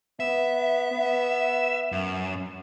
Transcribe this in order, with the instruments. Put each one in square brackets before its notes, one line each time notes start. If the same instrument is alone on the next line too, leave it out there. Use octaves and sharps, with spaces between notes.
[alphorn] B3 [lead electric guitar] E5
[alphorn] B3
[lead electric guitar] F#2